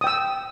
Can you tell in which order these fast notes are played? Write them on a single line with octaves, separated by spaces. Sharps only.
D#6 G5 E6